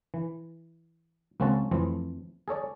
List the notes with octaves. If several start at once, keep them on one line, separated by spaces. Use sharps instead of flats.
E3
C#2 A#3 C4 C#4 F#4 A5
F2 E3 A3 C4
G#4 A4 C#5 D5